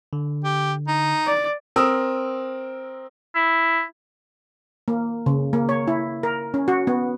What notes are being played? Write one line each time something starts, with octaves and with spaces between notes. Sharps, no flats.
D3
G4
D#4
D5
C4 A#4 D#6 E6
E4
A#3
C#3
A#3
C#5
E4
A#4
C#4
F#4
B3